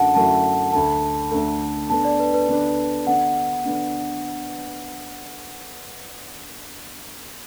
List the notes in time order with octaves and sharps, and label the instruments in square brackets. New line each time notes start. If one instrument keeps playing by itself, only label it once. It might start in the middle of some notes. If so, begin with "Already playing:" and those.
Already playing: [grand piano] F#2 D3 F#3 A3 E4 [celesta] F#5 A5
[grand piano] F#2 D3 F#3 A3 E4 [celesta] A5
[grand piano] D2 D3 A3 [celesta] A5
[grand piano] D2 D3 A3
[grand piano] D3 B3 D4 [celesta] A5
[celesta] D5
B4
B4
[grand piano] D3 B3 D4
[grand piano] D3 B3 D4 [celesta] F#5
[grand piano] D3 B3 D4